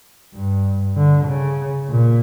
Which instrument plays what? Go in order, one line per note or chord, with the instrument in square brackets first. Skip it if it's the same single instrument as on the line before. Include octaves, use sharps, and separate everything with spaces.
[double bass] G2
D3
C#3
A#2